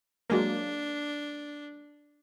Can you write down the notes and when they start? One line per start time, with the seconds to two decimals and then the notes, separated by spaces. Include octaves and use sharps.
0.30 F#3 G#3 A#3 D4